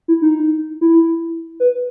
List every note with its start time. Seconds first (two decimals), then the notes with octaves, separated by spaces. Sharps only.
0.08 E4
0.22 D#4
0.81 E4
1.60 B4